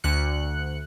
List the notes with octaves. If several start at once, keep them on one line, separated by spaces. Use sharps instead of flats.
D2 F#6 C#7